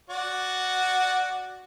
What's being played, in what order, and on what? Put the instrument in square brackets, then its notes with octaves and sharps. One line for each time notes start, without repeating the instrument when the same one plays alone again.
[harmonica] F#4 D5 F#5